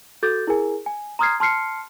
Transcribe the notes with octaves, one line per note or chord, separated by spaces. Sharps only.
F#4 A4 D6 G6 A6
E4 G#4 A#4 G#5
G#5
A#5 C6 D#6 F6 G#6 C7
A5 C6 F6 C7 C#7